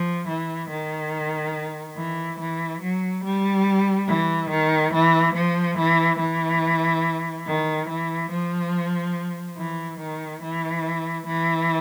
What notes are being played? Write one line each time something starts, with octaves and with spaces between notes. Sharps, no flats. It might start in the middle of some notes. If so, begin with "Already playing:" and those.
Already playing: F3
E3
D#3
E3
E3
F#3
G3
E3
D#3
E3
F3
E3
E3
D#3
E3
F3
E3
D#3
E3
E3